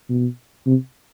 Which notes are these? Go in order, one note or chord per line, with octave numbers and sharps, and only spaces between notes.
B2
C3